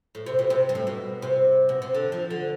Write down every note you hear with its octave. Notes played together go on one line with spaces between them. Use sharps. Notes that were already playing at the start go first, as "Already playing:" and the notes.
A2
C3
B2
C3
G2
A2
B2
C3
B2
C3
D3
F3
D3